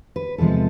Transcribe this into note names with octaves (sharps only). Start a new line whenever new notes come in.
B4
E2 C3 F3 G#3 A4